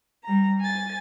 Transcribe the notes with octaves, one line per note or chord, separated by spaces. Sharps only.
G3 A#5
G#5 A6